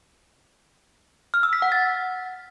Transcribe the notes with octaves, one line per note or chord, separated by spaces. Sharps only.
F6
E6
B6
F#5
A6